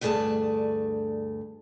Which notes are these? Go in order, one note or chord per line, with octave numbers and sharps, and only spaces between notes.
D2 G2 A3 G#4 D5 A5